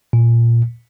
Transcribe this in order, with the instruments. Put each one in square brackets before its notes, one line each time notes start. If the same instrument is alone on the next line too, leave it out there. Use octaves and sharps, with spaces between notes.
[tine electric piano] A#2